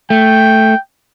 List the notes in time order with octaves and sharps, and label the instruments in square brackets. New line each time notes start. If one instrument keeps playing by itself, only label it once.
[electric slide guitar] A3 [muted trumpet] G5